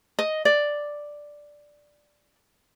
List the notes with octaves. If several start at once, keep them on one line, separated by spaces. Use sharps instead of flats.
D#5
D5